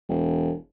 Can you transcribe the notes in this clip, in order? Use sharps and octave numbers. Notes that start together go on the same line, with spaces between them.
E1